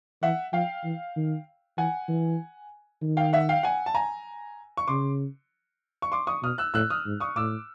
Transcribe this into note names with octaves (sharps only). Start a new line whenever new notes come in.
E3 E5 F#5
F3 F5 G5
E3
D#3
E3 F#5 G#5
E3
D#3
F5 G5
E5 F#5
F5 G5
F#5 G#5
A5
G#5 A#5
C#6
C#3 C6 D6
C#6
C6 D6
C#6 D#6
B2 D#6 F6
E6 F#6
A2 E6 F#6
D#6 F6
G#2
C#6 D#6
A2 D6 E6